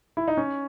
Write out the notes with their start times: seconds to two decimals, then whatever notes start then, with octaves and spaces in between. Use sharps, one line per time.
0.17 E4
0.28 D#4
0.37 C#4